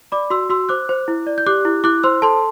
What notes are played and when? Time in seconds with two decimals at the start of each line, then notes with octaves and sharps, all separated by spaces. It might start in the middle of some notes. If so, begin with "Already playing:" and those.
0.12 D5 B5 D6
0.30 F#4 C6 E6
0.50 F#4 C6 E6
0.69 C5 D6 F#6
0.89 C5
1.08 E4
1.27 D5
1.38 G6
1.46 G4 D6 F#6
1.65 E4
1.84 E4 D6 F#6
2.03 C5 C6 E6
2.22 A4 A5 C6